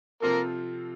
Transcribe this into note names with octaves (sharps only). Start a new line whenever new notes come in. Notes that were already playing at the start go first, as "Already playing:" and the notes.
C3 F3 A#3 C4 F4 A4 A#4